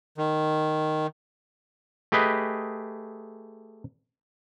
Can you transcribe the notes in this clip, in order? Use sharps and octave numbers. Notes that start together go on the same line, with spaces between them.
D#3
A3 G4 G#4 B4 D#5